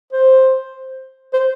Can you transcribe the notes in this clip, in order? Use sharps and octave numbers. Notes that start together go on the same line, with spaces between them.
C5
C5